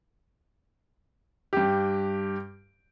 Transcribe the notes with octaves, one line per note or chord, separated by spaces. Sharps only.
G2 G4